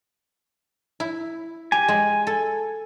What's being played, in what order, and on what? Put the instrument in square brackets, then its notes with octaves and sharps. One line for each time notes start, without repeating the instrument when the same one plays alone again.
[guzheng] E4
[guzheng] G4 [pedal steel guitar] G#5
[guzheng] G#3
A4